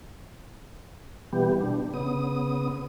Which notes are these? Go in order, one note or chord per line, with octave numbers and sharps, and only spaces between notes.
B2 E3 G3 B3 G4
B2 D4
C#3 B3 D#6